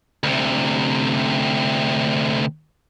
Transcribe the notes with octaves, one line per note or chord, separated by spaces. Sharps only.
D2 C3